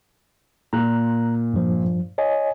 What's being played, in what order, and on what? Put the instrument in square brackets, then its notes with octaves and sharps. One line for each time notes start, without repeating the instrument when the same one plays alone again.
[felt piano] A#2 [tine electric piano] A#5 F#6
[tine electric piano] G2 F3
C#5 D#5 G#5